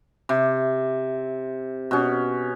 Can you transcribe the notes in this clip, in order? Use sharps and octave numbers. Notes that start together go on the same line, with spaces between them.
C3
B2 C#4